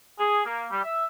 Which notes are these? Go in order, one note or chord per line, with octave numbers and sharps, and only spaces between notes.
G#4
A#3
G3
E5